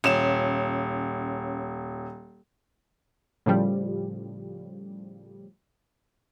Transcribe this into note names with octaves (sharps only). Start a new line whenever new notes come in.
D#1 C#4 F4 E7
A2 C#3 F3 G3